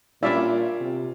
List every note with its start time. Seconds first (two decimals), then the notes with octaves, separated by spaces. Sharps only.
0.23 A#2 G3 C#4 D4 E4 F4 D5 E5
0.80 C3